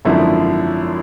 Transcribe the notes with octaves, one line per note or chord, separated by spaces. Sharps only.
G#1 F#2 D3 F3 E4